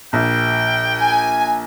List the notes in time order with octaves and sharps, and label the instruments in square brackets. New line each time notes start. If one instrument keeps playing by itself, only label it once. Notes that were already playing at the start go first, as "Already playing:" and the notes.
[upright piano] A#1 [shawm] G5
[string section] G#5